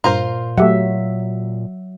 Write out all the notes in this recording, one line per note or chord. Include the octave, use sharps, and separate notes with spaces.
G2 A#2 F4 A#4 C5 A#5
F#3 A3 G4 E5 F#5